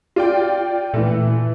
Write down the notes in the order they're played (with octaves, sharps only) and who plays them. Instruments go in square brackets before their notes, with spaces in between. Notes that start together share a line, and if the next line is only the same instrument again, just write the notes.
[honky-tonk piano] F4 D5 G5
[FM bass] A#2 [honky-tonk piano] E3 A3